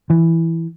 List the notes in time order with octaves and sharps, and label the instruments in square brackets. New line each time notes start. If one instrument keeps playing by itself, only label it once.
[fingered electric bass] E3